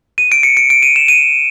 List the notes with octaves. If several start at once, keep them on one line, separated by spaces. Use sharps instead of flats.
D#7
D7
C#7
D7
D7
D#7
E7
D#7